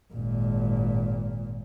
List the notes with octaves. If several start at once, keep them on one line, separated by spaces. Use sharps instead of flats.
G#1 A#2